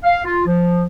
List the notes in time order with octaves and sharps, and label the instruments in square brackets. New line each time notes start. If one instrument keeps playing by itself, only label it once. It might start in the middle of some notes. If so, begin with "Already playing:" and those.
[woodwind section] F5
F4
F3